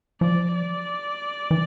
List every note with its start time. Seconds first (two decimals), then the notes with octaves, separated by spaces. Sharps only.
0.21 F3 D5
0.55 D5
1.51 E3